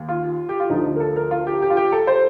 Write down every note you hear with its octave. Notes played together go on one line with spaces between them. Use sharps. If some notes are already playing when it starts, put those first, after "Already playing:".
Already playing: D#2
F4
G4
F4
D2 D3 F3 D#4
A#4
A4
A#4
F4
G4
G4
F4
G4
A4
C5